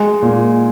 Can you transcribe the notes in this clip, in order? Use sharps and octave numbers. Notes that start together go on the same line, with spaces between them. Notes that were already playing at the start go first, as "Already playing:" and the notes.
Already playing: G#3
A#2